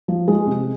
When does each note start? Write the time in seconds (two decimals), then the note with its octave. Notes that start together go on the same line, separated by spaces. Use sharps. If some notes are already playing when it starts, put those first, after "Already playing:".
0.08 F3
0.28 G#3
0.47 C3